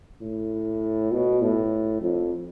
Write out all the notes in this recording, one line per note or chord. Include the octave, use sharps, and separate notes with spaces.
A2
B2
A2
F2